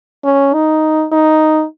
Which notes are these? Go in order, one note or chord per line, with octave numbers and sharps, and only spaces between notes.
C#4
D#4
D#4